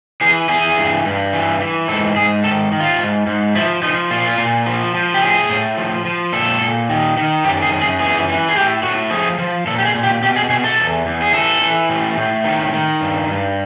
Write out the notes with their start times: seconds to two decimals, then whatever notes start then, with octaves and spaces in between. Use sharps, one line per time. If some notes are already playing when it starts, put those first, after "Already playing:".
0.21 E3 G#4
0.49 E3 G#4
0.77 G2
1.05 G2
1.33 E3
1.60 E3
1.88 G#2 A4
2.16 G#2 G#4
2.44 D#3 A4
2.72 D#3
2.80 F4
2.99 G#2
3.27 G#2
3.55 F3 E4
3.82 F3 D#4
4.11 A#2 F4
4.38 A#2
4.66 F3
4.95 F3
5.14 G4
5.21 A2 G#4
5.49 A2
5.77 F3
6.05 F3
6.32 A#2 A4
6.61 A#2
6.89 D#3
7.17 D#3
7.45 F#2 G4
7.63 G#4
7.72 F#2
7.81 G#4
8.00 E3 G#4
8.28 E3
8.49 G#4
8.55 A2 G4
8.83 A2 F#4
9.11 F3 G#4
9.39 F3
9.67 A#2 A4
9.78 G4
9.85 G#4
9.95 A#2
10.03 G4
10.22 B2 G4
10.36 G#4
10.50 B2 G#4
10.64 A4
10.78 E2
11.06 E2
11.22 G#4
11.34 E3 A4
11.61 E3
11.89 A2
12.17 A2
12.44 D#3
12.73 D#3
13.01 G2
13.28 G2